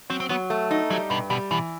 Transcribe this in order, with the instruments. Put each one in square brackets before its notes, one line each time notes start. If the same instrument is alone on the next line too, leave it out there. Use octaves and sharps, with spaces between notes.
[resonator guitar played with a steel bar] F#3 [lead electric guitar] C4
[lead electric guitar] C4
[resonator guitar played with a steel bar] F#3 [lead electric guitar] B3
[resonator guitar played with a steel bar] A3
D#4
[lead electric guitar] F#3 [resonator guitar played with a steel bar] G3
[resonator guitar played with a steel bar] G2 [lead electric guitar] B2
[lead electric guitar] B2 [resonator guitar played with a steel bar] G3
[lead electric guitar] B2 [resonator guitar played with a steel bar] E3